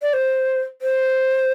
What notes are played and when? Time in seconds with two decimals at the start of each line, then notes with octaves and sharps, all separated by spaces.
0.02 D5
0.13 C5
0.82 C5